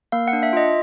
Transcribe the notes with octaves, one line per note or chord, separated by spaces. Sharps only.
A#3 F5
F#5
D4
E5
F4 D#5